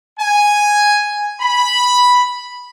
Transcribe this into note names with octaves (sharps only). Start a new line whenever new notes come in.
G#5
B5